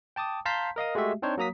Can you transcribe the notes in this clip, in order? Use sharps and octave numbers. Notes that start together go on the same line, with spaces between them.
G5 A5 D6 D#6
F5 A5 A#5 C6 G6 B6
A#4 D#5 F5 D#6
G#3 A3 F#4 G4 E5
C4 D4 D#4 C5 C#5
F#3 A#3 A#5 D#6 B6